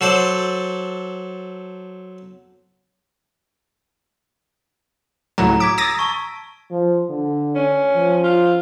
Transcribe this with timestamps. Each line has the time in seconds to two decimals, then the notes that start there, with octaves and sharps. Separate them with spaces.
0.01 F#3 A4 C5 D5
5.38 C#2 A2 F#3 A#5
5.60 D6 G#6 B6 D7
5.78 D#6 E6 A6 A#6
5.99 A5 C#6
6.71 F3
7.10 D3
7.55 C#4
7.95 F3
8.24 F4